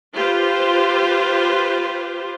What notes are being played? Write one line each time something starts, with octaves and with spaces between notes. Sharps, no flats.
F4 G4 B4 C5